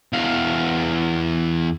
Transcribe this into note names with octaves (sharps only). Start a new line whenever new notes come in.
E2 F5